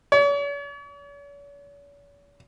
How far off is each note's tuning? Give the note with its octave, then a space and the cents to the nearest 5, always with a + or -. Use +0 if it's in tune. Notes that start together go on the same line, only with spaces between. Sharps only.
C#5 +45